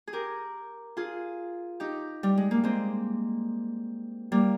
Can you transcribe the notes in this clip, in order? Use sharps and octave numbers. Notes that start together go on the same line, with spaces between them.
G#4
G4 A#4
F4 G#4
D#4 G4
G3
G#3
A#3
G#3 C4
G3 A#3